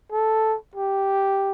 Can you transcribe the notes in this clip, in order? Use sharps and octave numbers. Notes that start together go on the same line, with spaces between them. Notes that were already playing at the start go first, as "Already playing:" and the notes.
A4
G4